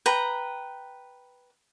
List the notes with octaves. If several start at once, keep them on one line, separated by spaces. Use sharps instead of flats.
B4 G5 A#5